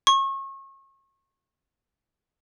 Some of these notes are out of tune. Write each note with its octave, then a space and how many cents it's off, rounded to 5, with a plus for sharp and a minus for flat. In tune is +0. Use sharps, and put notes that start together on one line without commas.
C#6 -35